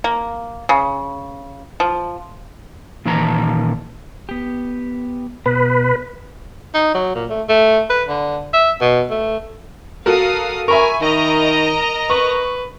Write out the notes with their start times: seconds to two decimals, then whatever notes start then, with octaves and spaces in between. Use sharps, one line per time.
0.04 A#3
0.69 C#3
1.80 F3
3.06 A#2 D#3 E3 A5 A#5
4.29 B3 G4
5.46 B2 B4
6.74 D#4
6.94 F#3
7.15 A#2
7.30 A3
7.49 A3
7.90 B4
8.08 D3
8.53 E5
8.81 B2
9.10 A3
10.06 F#4 A4 A#4 F5 D#6
10.68 A#4 E5 G#5 B5 C#6
11.01 D#3 A#4 D#5 A#5
12.10 B4 C#6